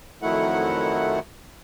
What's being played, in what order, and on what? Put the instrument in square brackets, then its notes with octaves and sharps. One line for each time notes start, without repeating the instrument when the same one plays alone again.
[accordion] F2 D#3 F#3 A3 E4 F#5